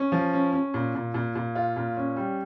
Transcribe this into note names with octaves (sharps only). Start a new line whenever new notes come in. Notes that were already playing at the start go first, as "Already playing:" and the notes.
Already playing: C#4
F3
C#4
C#4
A#2
A#2
A#2
A#2
F4
A#2
C#4
G3